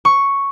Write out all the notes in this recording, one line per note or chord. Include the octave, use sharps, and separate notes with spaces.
C#6